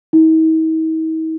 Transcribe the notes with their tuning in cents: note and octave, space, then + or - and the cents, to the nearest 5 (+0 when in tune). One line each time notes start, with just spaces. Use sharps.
D#4 +45